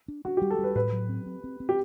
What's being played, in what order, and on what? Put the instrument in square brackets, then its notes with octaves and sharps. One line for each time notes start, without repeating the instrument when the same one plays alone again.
[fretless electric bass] D4
[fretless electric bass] D4 [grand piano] F#4
[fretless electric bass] G3 [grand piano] G4
[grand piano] A4
[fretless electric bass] G3 [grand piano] B4
[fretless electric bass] A2 [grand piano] B4
[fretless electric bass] F#3
C4
C4
C4
C4
[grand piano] G4